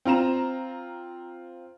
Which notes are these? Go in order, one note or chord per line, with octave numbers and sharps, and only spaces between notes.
C4 F4 A#5 E7